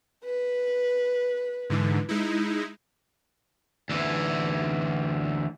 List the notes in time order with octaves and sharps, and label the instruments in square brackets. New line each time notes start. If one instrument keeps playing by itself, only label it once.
[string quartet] B4
[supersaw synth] G#2 D3 E3
G#3 D#4 E4
[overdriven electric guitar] D2 E3